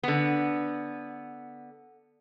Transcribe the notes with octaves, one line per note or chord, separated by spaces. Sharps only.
D3 B3